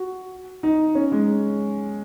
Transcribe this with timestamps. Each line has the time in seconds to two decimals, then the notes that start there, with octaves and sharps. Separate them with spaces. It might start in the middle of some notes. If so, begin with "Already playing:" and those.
Already playing: F#4
0.63 D#4
0.95 C#4
1.12 G#3